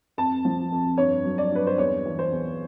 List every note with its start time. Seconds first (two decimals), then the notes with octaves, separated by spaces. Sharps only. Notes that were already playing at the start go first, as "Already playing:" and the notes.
0.18 F2 A5
0.45 F3
0.72 F2
0.98 G2 C#5
1.25 F#3
1.38 D5
1.51 G2 B4
1.67 C5
1.78 E2 C#5
2.06 E3
2.19 C5
2.31 E2